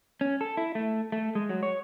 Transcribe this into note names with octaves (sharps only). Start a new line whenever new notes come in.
C#4
A4
E4
A3
A3
G#3
F#3
C#5